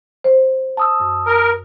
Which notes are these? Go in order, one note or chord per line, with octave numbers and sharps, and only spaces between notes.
C5
A5 D#6 E6
F#2
A#4